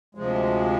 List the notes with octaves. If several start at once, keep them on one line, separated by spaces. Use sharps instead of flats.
D2 C3 F3 G#3